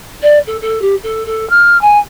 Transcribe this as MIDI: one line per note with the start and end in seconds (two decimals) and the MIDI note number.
0.22 0.38 74
0.47 0.57 69
0.61 0.81 69
0.81 0.95 67
1.03 1.23 69
1.26 1.48 69
1.49 1.79 89
1.81 1.98 80